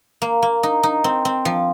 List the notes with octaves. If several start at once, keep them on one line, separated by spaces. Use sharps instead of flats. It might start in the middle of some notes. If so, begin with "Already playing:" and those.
A#3
A#3
D#4
D#4
C4
C4
F3